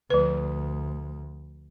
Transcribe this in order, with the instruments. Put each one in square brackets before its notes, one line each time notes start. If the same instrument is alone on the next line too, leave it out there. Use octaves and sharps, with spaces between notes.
[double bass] D2 [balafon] F3 B4